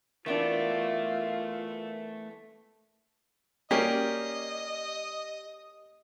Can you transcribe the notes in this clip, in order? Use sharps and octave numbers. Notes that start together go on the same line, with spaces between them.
E3 A3 B3 D4 F4 A#4 E5 D7
A#3 C#4 G4 D5 D#5